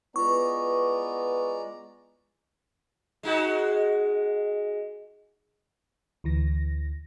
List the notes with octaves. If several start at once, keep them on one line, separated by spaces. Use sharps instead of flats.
G#3 B3 E4 F4 B4 D5 A#5 C#6
G#3 D#4 F#4
D2 E3 A#6